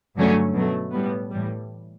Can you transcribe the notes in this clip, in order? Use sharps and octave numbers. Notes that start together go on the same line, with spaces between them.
G2 D3 F#3 A3 C#4
B2 F#3 A3
A2 G3 B3
A2 E3 G3